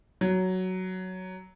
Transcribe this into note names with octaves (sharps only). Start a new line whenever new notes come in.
F#3